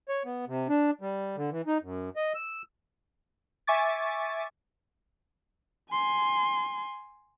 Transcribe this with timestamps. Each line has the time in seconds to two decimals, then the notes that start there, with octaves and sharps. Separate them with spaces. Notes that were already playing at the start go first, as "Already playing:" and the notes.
0.09 C#5
0.25 B3
0.47 C3
0.69 D4
1.01 G3
1.37 D3
1.51 E3
1.67 D#4
1.82 F#2
2.16 D#5
2.35 E6
3.67 E5 G#5 C#6 D6 A6
5.91 G#5 C6